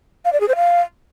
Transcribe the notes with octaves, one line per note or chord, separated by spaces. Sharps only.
F5
D5
G#4
C5
F5